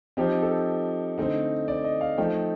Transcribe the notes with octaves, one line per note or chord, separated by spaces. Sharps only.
F3 C4 D#4 G4
A4
D3 A3 C4 D#4
D5
D#5
F5
F3 A3 D#4 G5